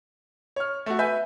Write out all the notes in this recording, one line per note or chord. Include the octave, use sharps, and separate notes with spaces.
C#5 F6
A3 F#4
B4 E5 G#5 G6